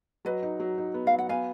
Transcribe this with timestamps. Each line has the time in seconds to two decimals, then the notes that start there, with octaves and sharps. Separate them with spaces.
0.25 F#3 B4 D#5
0.43 D#4
0.60 F#3
0.78 D#4
0.94 B3
1.07 F5
1.12 F#3
1.18 F#5
1.29 B3 F5 G#5